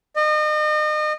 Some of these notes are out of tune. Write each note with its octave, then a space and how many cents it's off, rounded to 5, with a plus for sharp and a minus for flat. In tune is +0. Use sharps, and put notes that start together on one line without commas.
D#5 -35